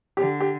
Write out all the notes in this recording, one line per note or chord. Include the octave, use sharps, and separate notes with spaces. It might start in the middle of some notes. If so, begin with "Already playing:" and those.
D3 G4
G4